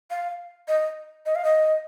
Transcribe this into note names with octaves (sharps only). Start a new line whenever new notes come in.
F5
D#5
D#5
F5
D#5